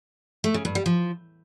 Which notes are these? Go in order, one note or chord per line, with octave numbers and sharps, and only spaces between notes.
A3
C#3
G2
G3
F3